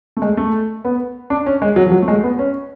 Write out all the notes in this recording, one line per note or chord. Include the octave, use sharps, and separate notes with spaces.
A3
G#3
A3
B3
D4
C#4
G#3
F#3
F3
F#3
A3
G#3
B3
C#4